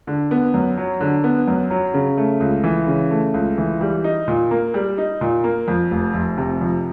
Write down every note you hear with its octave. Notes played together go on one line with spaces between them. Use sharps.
D3
B3
F#2
F#3
D3
B3
F#2
F#3
C#3
A3
C#2
E3
C#3
A3
C#2
E3
G3
D#4
A#2
A#3
G3
D#4
A#2
A#3
F2
F1
F1
C3
F2